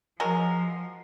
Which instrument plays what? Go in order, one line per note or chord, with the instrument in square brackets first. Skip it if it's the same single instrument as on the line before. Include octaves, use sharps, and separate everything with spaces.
[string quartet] F3 [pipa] F#3 G#3 A#4